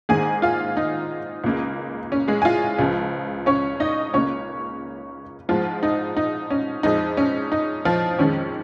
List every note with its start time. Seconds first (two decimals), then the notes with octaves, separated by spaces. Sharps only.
0.09 G#2 D#3 A#3 G#4 G#5
0.42 F4 F5
0.77 D#4
1.44 C#2 C#3 A#3
2.12 C#4
2.28 G#3 G#4
2.42 G#5
2.45 F4 F5
2.79 C#2 C#3 F3
3.46 C#4 C#5
3.80 D#4 D#5
4.14 C#2 C#3 A#3 C#4 C#5
5.49 G#2 F3 G#3 F4
5.83 D#4
6.17 D#4
6.51 C#4
6.83 F2 F3 G#3 D#4
7.17 C#4
7.52 D#4
7.85 F3 F4
8.18 F2 D#3 G#3 C#4